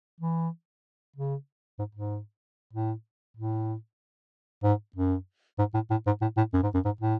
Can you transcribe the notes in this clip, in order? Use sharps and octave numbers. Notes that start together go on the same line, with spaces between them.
E3
C#3
G#2
G#2
A2
A2
G#2
F#2
G#2
A2
A2
G#2
A2
A2
F#2
G#2
F#2
G#2
A2